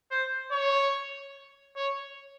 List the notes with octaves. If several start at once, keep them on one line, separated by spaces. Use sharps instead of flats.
C5
C#5
C#5